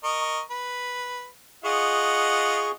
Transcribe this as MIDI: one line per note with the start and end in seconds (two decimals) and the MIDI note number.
0.04 0.40 70
0.04 0.40 75
0.04 0.40 85
0.50 1.27 71
1.64 2.75 65
1.64 2.72 68
1.64 2.75 75
1.64 2.75 78
1.64 2.72 85